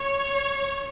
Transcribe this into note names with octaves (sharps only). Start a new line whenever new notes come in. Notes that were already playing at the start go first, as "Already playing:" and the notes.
Already playing: C#5